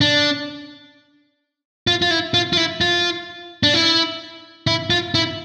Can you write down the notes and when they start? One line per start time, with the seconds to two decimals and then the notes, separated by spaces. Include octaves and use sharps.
0.01 D4
1.87 F4
2.02 F4
2.11 E4
2.34 F4
2.53 F4
2.57 E4
2.81 F4
3.63 D4
3.74 E4
4.67 E4
4.90 F4
5.14 E4